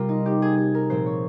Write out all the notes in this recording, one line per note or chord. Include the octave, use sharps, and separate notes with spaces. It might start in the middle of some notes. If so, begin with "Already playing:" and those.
Already playing: C3 G3 C4 F4 A#4
D#4
G4
G#4
G#4
A#4
A#2 F3 C4 C5
C#5